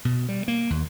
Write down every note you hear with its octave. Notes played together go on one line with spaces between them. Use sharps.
B2
G3
A#3
D#2